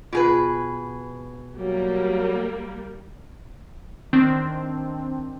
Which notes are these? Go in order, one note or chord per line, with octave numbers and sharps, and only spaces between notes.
B2 F4 G#4 B4
F#3 G3 A#3
D#3 C4 D4